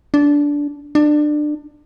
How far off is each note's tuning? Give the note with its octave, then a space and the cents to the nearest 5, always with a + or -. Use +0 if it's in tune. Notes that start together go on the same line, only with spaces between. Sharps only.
D4 -15
D4 +25